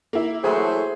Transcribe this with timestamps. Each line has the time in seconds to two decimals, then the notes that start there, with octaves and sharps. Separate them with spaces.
0.13 A#3 E4
0.44 E3 F#3 A3 G#4 A4 C5